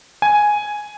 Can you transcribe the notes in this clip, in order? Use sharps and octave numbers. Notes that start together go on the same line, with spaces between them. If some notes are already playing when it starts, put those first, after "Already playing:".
G#5